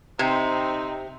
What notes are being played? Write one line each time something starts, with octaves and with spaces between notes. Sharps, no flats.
C3 C4 D#4